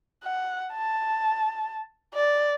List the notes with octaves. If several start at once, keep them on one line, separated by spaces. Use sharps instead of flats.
F#5
A5
D5